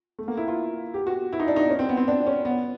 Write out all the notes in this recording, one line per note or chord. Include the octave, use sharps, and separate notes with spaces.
A3
A#3
E4
F4
G4
F#4
E4
D#4
D4
D#4
C#4
C4
B3
C4
D4
C#4
B3